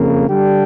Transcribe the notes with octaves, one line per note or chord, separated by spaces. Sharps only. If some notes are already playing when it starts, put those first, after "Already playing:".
Already playing: F2 C#3 A#3
D3 G3 D4 G4